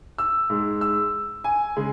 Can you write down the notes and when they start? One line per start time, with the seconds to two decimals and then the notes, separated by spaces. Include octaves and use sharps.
0.18 E6
0.50 G#2 G#3
0.81 E6
1.44 G#5
1.76 C#3 G#3